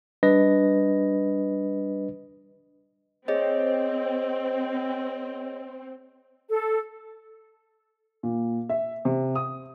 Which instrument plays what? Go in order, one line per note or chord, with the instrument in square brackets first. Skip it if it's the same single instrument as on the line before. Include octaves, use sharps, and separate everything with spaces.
[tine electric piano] G3 D4 B4 D#5 A#6
[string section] C4 [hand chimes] G#4 C#5 D#5
[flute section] A4
[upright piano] A#2
E5
C3
D#6